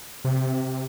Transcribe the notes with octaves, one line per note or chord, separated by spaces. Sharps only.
C3